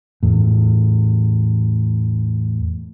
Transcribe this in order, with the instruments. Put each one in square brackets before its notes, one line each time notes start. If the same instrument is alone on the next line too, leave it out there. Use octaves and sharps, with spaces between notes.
[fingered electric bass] E2 A2